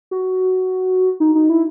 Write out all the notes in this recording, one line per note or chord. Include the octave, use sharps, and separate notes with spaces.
F#4
D#4
D#4
E4